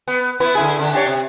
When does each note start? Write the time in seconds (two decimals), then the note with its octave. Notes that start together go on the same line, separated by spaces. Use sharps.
0.08 B3
0.40 B3 E4 B4
0.55 D3 E4 G#4
0.79 D3 D4
0.93 D4 G4 C#5
1.07 C3